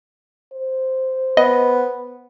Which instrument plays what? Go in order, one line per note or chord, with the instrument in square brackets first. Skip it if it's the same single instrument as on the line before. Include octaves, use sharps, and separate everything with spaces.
[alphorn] C5
[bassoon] B3 [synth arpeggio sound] D#5